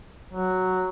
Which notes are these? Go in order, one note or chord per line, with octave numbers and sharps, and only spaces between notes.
F#3